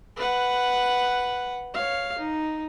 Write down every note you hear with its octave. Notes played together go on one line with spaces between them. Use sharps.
B4 F#5
C#5 F5
D#4